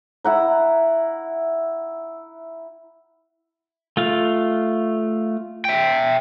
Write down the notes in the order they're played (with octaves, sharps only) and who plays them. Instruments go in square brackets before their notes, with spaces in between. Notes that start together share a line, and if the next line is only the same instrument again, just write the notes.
[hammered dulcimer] E4 F#5 A#5
[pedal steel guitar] A3 F4 F5
[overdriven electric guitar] E5 G5